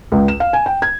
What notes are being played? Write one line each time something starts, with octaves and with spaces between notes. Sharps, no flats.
C#2
E7
F5
G#5
G5
G#6